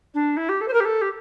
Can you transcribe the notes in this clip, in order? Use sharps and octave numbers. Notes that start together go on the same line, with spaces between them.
D4
E4
G4
A4
C5
A#4
G4
A4
G4